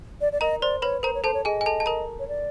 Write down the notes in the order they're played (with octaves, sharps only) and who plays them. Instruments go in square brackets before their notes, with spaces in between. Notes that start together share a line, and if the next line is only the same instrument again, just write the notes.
[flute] D5
D5
[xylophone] A#4 A#5 [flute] D#5
[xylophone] C5 C6 [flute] D5
[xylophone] B4 B5 [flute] C#5
[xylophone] A#4 A#5 [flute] C5
[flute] C#5
[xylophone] A4 A5 [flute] C5
[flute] C#5
[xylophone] G#4 G#5 [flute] D#5
[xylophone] G#5
A4 A5
A5
A#4 A#5
[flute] C#5
D5